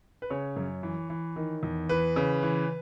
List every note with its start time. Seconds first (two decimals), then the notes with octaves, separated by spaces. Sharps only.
0.22 B4
0.30 C#3 C#5
0.56 F#2
0.83 E3
1.10 E3
1.36 D#3
1.63 E2
1.89 E3 B4
2.16 C#3
2.43 E3